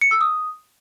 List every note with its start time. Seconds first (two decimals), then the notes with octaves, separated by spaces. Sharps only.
0.01 C#7
0.11 E6
0.21 D#6